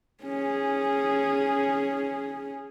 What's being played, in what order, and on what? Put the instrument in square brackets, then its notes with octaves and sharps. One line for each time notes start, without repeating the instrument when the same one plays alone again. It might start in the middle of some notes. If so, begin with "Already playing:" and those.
[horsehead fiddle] C#4 G#4